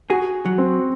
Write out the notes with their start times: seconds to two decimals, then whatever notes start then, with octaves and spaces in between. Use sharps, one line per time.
0.10 F#4 G#4
0.46 F#3
0.58 C4